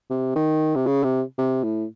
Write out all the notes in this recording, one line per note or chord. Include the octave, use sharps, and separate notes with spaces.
C3
D#3
C3
C#3
C3
C3
A2